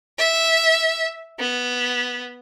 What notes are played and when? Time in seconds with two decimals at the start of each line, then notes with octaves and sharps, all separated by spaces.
0.19 E5
1.40 B3